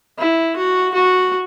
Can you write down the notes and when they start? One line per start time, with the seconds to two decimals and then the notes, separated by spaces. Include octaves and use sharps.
0.18 E4
0.57 F#4
0.94 F#4